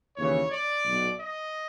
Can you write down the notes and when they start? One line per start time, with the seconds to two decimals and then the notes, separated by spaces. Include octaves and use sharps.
0.16 D#2 C#3 E3 C#5
0.51 D5
0.85 B1 B2
1.20 D#5